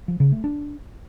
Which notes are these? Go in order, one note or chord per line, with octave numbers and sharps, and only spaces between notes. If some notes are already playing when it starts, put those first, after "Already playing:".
F3
C#3
A3
D4